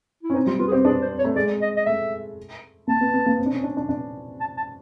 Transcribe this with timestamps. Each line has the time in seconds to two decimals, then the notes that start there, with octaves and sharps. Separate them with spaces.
0.23 E4
0.30 C#4
0.34 C4 D#4
0.46 G3 F4
0.59 B3 F4
0.68 G#4
0.72 C4 G4
0.85 D4 G#4
1.02 C5
1.19 C#5
1.25 A3
1.36 G#3 D5
1.61 D#5
1.77 D#5
1.86 A3 E5
2.87 A#3 A5
3.01 B3
3.14 B3
3.26 A#3
3.39 C4
3.46 D4
3.51 C#4
3.64 D4
3.77 D4
3.89 D4
4.40 A5
4.57 A5